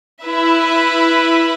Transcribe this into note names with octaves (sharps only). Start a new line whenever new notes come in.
E4 B4 E5